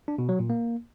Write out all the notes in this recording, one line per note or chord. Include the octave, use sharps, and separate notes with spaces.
D4
B2
F#3
A#2
A#3